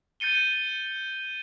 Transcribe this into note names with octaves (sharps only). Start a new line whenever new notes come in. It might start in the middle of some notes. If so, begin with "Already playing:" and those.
G6 A6 C#7 D#7 G7